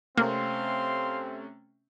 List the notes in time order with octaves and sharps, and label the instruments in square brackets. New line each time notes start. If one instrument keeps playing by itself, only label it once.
[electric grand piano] C3 A3 C#4 [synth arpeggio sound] A#3 [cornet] C4 [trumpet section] F5 C6